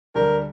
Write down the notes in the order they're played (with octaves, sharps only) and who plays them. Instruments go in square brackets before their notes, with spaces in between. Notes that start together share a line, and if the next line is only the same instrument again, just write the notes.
[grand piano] D2 D3 G3 D4 G4 [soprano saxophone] A#4